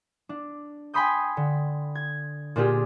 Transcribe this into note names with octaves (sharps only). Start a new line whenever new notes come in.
D4
G5 G#5 B5 C6 D#6 G6
D3
G#6
A#2 C4 D4 F4 G4 G#4